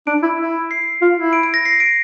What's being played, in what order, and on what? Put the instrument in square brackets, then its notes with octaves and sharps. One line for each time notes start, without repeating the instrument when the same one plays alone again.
[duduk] D4 [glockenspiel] D7
[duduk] E4
E4
[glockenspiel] C7
[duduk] F4
E4
[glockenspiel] D7
D7
A#6
C7
D7